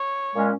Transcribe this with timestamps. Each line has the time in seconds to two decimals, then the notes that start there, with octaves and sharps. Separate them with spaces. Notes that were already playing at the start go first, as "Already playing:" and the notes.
Already playing: C#5
0.36 A#2 G#3 C#4